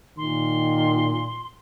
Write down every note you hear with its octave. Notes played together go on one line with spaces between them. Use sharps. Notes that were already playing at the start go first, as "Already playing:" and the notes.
A#2 D#3 C6